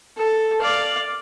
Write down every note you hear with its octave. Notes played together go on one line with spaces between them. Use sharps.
A4
D5 F5